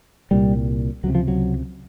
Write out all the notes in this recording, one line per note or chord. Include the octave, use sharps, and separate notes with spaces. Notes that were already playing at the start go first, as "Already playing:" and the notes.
C2 A#2 G3
C#2 C3 F#3
F3
F#3